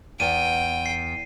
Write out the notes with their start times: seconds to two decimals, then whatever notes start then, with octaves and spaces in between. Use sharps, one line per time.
0.20 E2 F#5 G5 D#7
0.86 C7